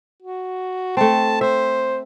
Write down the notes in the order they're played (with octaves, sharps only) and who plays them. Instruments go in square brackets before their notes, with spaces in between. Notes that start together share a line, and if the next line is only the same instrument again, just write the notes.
[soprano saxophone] F#4
[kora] A3 C4 [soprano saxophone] A5
[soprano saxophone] C5 [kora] E5